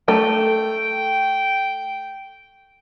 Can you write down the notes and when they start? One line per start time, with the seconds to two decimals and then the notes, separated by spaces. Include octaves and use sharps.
0.08 A3 G5